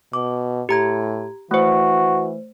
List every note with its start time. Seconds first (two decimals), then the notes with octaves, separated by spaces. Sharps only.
0.13 B2 D6
0.69 A2 G4 A#5 G#6
1.51 E3 A3 F#4 C5